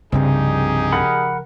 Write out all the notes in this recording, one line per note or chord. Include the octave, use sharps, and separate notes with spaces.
C2 G2 C#3 F3 C4 D#4 G4 G#4
A#4 F#5 B5